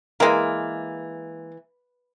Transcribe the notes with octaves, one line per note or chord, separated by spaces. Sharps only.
E3 G#3 A#3